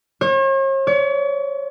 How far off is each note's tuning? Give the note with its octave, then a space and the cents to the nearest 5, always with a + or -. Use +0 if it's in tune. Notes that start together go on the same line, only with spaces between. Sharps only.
C#5 -45
C#5 +40